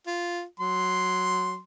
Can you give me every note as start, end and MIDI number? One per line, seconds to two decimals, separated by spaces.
0.07 0.43 65
0.60 1.59 54
0.60 1.59 84